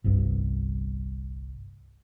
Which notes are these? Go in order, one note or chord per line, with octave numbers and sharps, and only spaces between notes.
G1 C2 G2